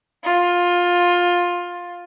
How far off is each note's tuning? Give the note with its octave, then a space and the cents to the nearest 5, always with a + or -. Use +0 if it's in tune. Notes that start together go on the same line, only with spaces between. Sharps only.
F4 +15